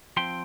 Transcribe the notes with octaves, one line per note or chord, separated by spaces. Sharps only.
F3 C4 G5 C6